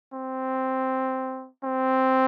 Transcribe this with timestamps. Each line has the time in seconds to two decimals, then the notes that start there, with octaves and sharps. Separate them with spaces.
0.13 C4
1.64 C4